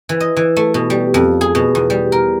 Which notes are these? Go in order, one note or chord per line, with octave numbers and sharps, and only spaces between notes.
E3
D#5
E3
A3
B2
G3
F2
G#4
B2
E2
G3
A#4